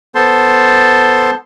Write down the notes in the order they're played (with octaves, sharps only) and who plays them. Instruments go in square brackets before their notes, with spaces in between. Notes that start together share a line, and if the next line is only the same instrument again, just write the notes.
[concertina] B3 A4 C5 A5 C6